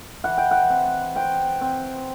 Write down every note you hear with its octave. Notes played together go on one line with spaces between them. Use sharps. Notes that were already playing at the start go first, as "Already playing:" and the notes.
E3 F#5
G5
F#5
C4
C4 G5
C4